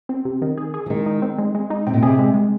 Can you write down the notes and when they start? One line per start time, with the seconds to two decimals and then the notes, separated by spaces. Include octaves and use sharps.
0.09 C4
0.25 C3
0.42 D#3
0.57 G#4
0.74 G#4
0.86 F3
0.90 D#3 G#3
1.06 D#4
1.22 C4
1.38 G#3
1.55 G#3
1.70 D#4
1.87 C3 C4
1.94 A#2
2.02 C3 G#4
2.19 G#3
2.34 G#3